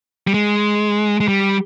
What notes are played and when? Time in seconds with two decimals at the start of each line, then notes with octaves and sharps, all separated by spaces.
0.27 G3
0.34 G#3
1.20 G#3
1.28 G3